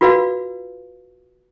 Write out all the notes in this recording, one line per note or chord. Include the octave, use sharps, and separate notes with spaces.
F4 F#4 B4 D5 F5